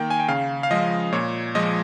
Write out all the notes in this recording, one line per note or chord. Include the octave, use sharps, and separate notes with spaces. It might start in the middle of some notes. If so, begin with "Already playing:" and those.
Already playing: D#3 A#3 G5
G#5
G5
C#3 F5
F5
F3 G#3 D#5
A#2 C#5
F3 G#3 D#5